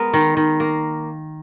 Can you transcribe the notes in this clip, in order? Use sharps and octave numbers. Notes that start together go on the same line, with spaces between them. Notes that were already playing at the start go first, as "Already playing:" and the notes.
Already playing: G#3 B3 A#4
D#3
D#3
A#3